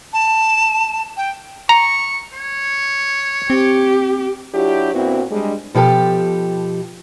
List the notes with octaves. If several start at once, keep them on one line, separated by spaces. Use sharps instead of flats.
A5
G5
A#5 C#6
C#5
C4 G4
F#3 D4 E4 F4 G4
A#2 B3 C4 D4 E4 F#4
G3 G#3 D4
B2 F3 G4 A4